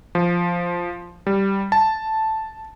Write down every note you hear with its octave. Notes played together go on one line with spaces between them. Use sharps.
F3
G3
A5